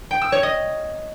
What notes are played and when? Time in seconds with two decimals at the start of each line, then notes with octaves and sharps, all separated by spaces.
0.11 G5
0.22 E6
0.32 C#5
0.43 D#5